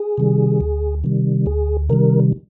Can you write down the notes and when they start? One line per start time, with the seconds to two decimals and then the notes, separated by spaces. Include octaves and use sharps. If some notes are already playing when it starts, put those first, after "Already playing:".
Already playing: G#4
0.18 C3 D#3 G3
0.60 D2
1.04 C3 D#3 G3
1.46 D2 G#4
1.90 C3 D#3 G3 A#4